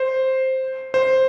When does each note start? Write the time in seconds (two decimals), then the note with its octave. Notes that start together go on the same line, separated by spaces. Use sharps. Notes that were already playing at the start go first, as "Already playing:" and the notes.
Already playing: C5
0.94 C5